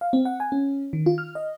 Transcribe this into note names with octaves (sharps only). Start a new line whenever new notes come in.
F5
C4
F#5
G#5
C#4
D#3
F4
F6
D#5